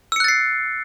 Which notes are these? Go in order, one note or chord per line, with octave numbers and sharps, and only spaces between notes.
E6 F#6 A6 C7 C#7